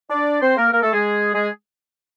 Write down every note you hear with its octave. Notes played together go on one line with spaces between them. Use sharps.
D4 D5
C4 C5
A#3 A#4
A#3 A#4
A3 A4
G#3 G#4
G#3 G#4